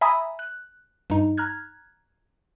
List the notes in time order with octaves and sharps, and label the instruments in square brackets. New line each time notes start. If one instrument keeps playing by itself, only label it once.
[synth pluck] E5 G#5 A#5 B5 D#6
F#6
G2 D#4
A#5 F6 F#6 G#6